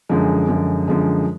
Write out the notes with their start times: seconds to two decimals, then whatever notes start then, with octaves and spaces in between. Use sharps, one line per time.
0.09 F#2 D3 F3 G#3
0.48 F#2 D3 F3 G#3
0.88 F#2 D3 F3 G#3